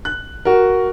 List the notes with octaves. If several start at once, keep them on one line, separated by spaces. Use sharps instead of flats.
F#6
F#4 A#4